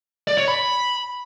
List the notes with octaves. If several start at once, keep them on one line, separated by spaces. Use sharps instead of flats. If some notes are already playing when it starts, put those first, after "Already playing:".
D5
C#5
B5